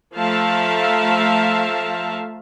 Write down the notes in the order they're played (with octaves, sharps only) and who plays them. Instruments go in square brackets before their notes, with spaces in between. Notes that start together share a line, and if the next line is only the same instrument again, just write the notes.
[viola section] F3 A3 E5 F5 A5 A#5